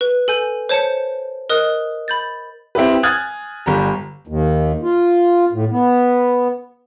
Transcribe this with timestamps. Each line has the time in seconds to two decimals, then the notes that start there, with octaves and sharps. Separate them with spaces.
0.01 B4
0.28 A4 G#5 G6
0.69 C5 C#5 A5 G6 C#7
1.50 A#4 D#5 D#6 F#6
2.08 B5 G6 A6
2.75 C4 E4 G4 B4
3.03 G#5 D#6 F6 F#6 G#6 A6
3.66 G1 G3 A#5
4.27 D#2
4.83 F4
5.53 A2
5.71 B3